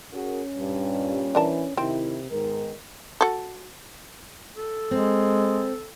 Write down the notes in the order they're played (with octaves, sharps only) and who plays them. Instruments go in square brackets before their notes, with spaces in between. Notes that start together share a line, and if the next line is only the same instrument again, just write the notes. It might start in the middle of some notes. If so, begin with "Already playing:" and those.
[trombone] C#4 [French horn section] F#4 G#4 A#4
[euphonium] G2 [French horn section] A#2 G3
[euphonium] E3 [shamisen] D4 A#4 A5
[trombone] C3 [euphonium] D#3 [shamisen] C4 [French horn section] E4
[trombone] G#2 [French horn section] D#3 G#3 B3 [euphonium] A#4
[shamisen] F#4 A4
[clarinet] A4
[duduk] G#3 [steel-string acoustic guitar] C4